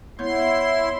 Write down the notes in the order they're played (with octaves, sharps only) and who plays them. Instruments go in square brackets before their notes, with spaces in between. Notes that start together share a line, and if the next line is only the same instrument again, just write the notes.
[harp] B3 C#5 G6 [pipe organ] E4 C6